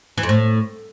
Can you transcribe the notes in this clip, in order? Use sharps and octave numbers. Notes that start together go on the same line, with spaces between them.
E3
F2
A2